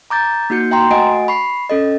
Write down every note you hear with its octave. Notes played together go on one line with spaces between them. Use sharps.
A#5 D6 G6 A6
A#3 D#4 F#4 G6 C#7
E5 G5 A#5 C6
A3 F#4 D#5 F#5 G#5 D7
B5 C#6 C7
C#4 A4 D#5